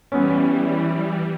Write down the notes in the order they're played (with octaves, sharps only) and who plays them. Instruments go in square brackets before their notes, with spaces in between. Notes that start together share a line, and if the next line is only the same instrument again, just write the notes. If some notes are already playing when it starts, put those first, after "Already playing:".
[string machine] E3 G3 [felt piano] B3 C#4